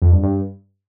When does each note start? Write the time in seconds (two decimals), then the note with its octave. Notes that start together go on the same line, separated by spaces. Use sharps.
0.02 F2
0.12 G2
0.23 G2